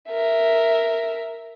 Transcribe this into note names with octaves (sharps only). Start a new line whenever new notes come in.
A#4 E5